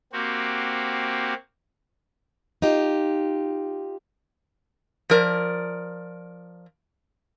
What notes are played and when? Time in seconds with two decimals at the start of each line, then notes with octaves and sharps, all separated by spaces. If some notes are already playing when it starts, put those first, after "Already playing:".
0.13 A#3 C4 F#4 G4
2.62 D#4 F4 G4
5.10 F3 A#4 D5